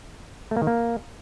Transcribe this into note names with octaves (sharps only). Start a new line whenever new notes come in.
A3
A#3
D#3
A#3